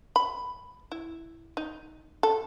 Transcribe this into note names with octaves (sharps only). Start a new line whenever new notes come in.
B5
E4
D#4
A4